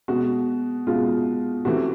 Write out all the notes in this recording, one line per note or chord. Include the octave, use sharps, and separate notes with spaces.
B2 G#3 F#4
B2 G#3 F4
C3 E3 A3 F#4